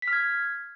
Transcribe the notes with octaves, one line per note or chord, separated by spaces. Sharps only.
B6
F6
G#6